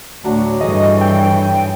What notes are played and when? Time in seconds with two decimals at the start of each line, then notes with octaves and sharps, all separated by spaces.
0.24 D2 A2 F#3 D4 F#4
0.61 G2 E3 G#4 A4 C#5 D#5
1.01 G5
1.41 G#5